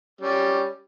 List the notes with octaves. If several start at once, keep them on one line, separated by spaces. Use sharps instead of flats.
G3 C#4